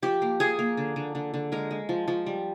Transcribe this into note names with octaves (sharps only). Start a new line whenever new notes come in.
F3 G4
A#3
F3 G#4
A#3
D3
D3
D3
D3
G#3 A#4
G#3
F3
F3
G3